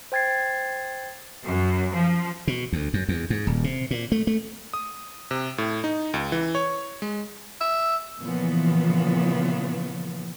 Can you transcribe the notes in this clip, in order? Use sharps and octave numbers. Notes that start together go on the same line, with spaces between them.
C5 G5 G#6 A6 C7
F#2
F3
B2
D2
F#2
E2
G#2
D#1
C3
A#2
A3
A3
D#6
C3
A2
D#4
C#2
E3
C#5
G#3
E5
A#2 C#3 E3 F3 B3